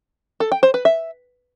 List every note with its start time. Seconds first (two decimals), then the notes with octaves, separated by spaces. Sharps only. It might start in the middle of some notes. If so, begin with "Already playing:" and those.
0.40 A4
0.52 G5
0.63 C5
0.74 B4
0.85 E5